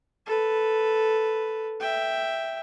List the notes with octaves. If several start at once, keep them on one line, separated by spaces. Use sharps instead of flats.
A4 B4
E5 G5